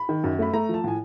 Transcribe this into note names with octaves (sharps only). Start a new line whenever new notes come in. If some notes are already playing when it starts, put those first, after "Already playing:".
Already playing: B5
D#3
F#2
A3 B5
A3 A#5
F3 A5
A2 G#5